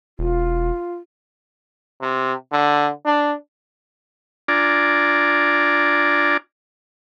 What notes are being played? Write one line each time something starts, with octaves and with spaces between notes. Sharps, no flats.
E1 F4
C3
D3
D4
D4 F4 D5 G#5 A#5